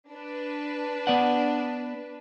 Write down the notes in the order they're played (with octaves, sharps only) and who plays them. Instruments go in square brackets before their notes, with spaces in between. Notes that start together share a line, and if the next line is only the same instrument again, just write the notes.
[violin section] D4 B4
[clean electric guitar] B3 D5 F#5